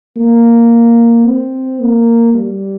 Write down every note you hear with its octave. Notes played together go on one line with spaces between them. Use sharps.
A#3
C4
A#3
G3